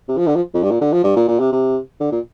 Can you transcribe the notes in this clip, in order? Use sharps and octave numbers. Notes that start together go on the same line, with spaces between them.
C3
F3
D3
F3
F2
G2
A#2
D3
F3
G2
A#2
A#2
C3
C3
D3
A#2